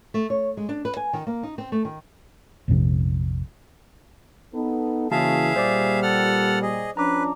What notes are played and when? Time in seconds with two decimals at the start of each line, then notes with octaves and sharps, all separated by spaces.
0.14 A3
0.30 C#5
0.57 G#3
0.69 D4
0.85 B4
0.97 G#5
1.13 D#3
1.27 A#3
1.43 D#4
1.58 C4
1.72 A3
1.85 D#3
2.68 A#1 F2 C3 F3
4.54 B3 D#4 A4
5.11 C#3 E3 A#3 F#4 G#4 E5 F5 A5
5.56 A#2 G3 C5 D5 D6
6.02 A4 F#5 F6
6.62 G#4 D#5
6.97 F3 C#4 D4 B4 A#5 D6